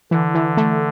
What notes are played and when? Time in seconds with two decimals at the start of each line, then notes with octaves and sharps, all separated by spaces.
0.11 D3 E3
0.34 E3
0.57 A3